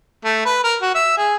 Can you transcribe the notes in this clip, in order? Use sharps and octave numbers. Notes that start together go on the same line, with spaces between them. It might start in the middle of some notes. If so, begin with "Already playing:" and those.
A3
B4
A#4
F#4
E5
G#4